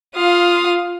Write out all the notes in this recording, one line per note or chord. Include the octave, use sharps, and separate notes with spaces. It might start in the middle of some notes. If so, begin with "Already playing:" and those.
F4 F5 D#6